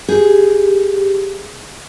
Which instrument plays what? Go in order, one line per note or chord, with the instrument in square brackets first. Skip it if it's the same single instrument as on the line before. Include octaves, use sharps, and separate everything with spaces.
[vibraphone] G4 [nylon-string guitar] G#4